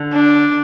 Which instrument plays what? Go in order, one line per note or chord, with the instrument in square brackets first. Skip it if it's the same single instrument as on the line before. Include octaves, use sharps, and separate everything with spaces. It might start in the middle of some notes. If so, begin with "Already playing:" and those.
Already playing: [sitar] D3
[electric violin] D4